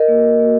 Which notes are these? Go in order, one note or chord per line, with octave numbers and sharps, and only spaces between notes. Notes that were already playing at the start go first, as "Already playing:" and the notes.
Already playing: A#4 D#5
A#3 F#4
A#3 F#4